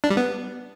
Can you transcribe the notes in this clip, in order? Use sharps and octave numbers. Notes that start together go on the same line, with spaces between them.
D4
G3
B3